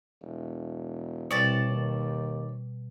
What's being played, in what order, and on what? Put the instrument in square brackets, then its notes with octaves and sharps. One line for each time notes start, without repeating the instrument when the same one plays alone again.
[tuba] E1
[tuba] C2 [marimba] B2 G3 [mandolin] C#5 D5 A5
[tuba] D#2